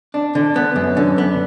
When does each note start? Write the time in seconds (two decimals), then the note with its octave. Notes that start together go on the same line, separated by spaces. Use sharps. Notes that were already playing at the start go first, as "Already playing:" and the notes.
0.14 D4
0.35 D3
0.56 B3
0.76 F#2
0.97 D3
1.18 B3